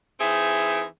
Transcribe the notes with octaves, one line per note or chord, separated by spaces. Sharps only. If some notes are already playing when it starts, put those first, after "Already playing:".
E3 C4 D#4 G#4 E5